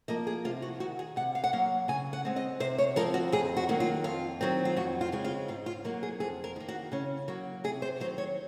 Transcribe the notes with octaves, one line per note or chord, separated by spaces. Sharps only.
F3 A#3 D#5
G#4
C3 F4
F#4
D#3 G#3 F#4
G#4
C3 F#5
F5
F#5
F#3 A#3 F5
C#3 G#5
F#5
G#3 C4
D#5
C3 C5
C#5
F3 G#3 C4 A#4
F#4
F2 G#4
F#4
D#3 F#3 A#3
F4
F2 F4
D#3 F#3 C4
F4
F2 F#4
F4
C#3 G#3 C4
F4
G#2 F4
F4
F#3 A#3 F#4
G#4
F2 G#4
A#4
D#3 A#3
F#4
C#3 C#4
F#3 A#3 F#4
C3 G#4
C5
D#3 F#3 C5
C#5